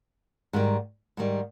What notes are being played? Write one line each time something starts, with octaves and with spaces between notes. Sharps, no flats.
G#2 D#3 G3
G#2 D#3 G3